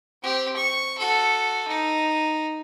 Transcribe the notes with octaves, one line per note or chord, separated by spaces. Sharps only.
C4 G4
C#6
F#4 A4
D#4